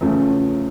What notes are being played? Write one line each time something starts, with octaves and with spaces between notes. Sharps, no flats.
E2 C#3 F3 A3 C#4